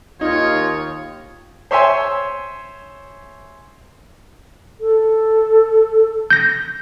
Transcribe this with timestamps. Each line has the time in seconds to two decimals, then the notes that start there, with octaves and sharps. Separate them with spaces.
0.21 D#2 D#4 F4 C#5
1.71 C5 C#5 E5 G#5 C6
4.81 A4
6.30 G6 A#6